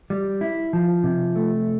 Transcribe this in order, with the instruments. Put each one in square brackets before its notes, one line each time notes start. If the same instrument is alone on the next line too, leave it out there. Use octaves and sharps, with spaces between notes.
[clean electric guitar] G3
E4
F3
C3
A3